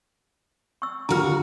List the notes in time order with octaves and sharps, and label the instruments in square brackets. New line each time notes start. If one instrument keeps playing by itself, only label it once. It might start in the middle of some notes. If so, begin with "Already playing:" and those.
[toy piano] C#6 E6
[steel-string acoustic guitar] D#2 F#4 [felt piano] D3 C#6 F6 [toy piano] F4 A#5